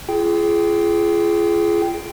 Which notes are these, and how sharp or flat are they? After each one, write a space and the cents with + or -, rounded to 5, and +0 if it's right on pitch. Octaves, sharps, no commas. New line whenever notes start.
F4 -35 G#4 +15 G5 +0